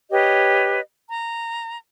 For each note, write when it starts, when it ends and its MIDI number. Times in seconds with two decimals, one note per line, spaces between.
0.11 0.79 67
0.11 0.79 71
0.11 0.79 73
0.11 0.79 75
1.08 1.79 82